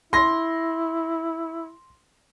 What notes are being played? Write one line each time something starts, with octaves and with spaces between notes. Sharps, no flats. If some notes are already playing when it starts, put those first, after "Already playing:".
E4 C6 A#6